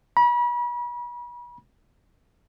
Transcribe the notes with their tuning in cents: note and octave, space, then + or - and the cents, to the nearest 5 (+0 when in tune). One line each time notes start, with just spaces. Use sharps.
B5 -40